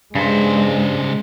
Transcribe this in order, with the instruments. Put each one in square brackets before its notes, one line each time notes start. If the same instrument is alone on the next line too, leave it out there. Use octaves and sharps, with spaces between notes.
[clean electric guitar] G2 [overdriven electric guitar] C#3 C5 [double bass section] G#3